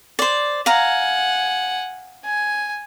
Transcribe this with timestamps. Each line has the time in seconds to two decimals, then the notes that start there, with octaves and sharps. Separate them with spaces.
0.19 C5 D5
0.66 F5 F#5 G#5 A#5
2.24 G#5